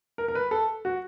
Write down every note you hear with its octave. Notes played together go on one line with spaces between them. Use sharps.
A#4
A#4
B4
A4
F#4